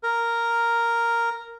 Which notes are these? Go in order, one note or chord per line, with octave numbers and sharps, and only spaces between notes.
A#4